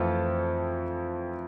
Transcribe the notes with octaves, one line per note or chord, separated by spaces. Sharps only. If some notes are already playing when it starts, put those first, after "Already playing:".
Already playing: F2 E3 A3 C4 F4 A4